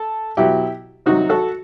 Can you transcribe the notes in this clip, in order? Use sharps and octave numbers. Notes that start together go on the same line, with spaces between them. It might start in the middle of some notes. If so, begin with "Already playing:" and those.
Already playing: A4
B2 F#3 E4 G4
C3 D#3 F#3 D#4 F#4
F#4 A4